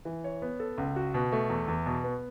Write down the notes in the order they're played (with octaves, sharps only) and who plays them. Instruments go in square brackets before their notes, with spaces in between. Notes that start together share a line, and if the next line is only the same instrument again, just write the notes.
[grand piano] E3
C#5
B3
A4
C#2
F#4
B2
A3
E2
E2
B2
B3